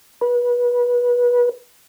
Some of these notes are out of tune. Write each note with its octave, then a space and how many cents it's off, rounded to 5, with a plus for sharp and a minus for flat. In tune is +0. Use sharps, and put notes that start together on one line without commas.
B4 -25